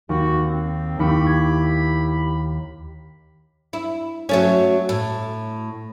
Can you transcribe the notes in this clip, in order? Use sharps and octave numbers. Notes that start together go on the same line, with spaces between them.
D#2 F#4
D#3 C4
D#2 E4 G4 B5 C#6 E6
G#6
E4
F#3 A3 C#4
A2